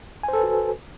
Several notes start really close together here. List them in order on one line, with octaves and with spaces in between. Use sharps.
G#5 C5 A4 B4 F#4